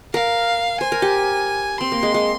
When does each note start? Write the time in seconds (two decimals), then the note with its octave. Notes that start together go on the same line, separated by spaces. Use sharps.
0.14 A#4 F5
0.81 C5 G#5
0.92 A#4
1.02 G4
1.81 C4 C6
1.92 A#3
2.03 G#3
2.14 G#3